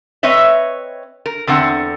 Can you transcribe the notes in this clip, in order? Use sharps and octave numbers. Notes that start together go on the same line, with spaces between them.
C4 B4 C#5 D#5 E5
A#4
E2 D3 C4 F#5